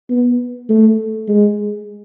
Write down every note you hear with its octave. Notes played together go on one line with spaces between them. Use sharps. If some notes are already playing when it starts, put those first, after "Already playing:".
B3
A3
G#3